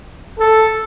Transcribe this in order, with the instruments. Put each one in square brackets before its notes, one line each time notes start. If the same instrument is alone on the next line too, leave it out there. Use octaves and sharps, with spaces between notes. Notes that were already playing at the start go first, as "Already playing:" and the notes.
[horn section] A4